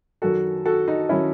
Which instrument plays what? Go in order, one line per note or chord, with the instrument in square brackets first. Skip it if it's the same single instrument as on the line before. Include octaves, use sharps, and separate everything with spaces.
[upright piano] F#2 D#3 F#3 F#4 A4
F#4 A4
D#4 F#4
D#3 F#3 C#4 E4